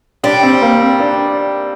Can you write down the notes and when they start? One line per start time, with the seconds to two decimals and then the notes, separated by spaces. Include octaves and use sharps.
0.24 G3 D4
0.43 C4
0.62 A#3
0.81 C4
1.00 D4